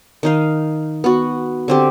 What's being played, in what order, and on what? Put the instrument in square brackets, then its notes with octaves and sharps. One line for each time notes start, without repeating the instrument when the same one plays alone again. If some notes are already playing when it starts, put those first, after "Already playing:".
[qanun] D#3 D#4 F5
B3 F#4
D3 C4 G4